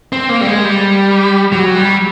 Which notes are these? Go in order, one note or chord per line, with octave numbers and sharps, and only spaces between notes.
C4
A#3
G3
G#3
G3
F#3
G3